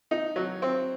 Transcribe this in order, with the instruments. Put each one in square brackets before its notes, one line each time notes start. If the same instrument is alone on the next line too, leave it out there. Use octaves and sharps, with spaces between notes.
[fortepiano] D#4
F#3
C4